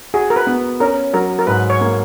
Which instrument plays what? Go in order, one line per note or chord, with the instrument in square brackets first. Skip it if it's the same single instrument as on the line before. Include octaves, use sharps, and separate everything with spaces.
[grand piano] F#4 [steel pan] G#4
[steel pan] A#4
B4
[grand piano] B3
[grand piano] C#4 [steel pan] A#4
[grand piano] F#3 [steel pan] A#4
[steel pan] A#4
[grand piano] G#2 [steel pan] B4
[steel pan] C#5
[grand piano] A#3